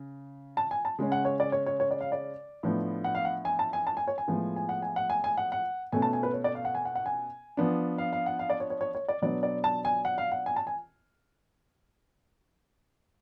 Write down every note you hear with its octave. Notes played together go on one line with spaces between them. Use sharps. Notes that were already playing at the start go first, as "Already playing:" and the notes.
Already playing: C#3
A5
G#5
A5
C#3 G#3 C#4
F#5
C#5
D5
C#5
C#5
C#5
D5
F5
D5
A2 F3 B3 D4
F#5
F5
F#5
G#5
A5
G#5
A5
G#5
C#5
G#5
A2 F3 G#3 B3
G#5
F#5
G#5
F#5
G#5
G#5
F#5
F#5
B2 A3 C#4 G#5
A5
G#5
B4
C#5
D5
F5
F#5
G#5
F#5
F#5
G#5
F3 B3 D4
F5
F5
F#5
F5
D5
C#5
C#5
C#5
C#5
D5
B2 F#3 B3 D4 D5
D5
A5
G#5
F#5
F5
F#5
G#5
A5
G#5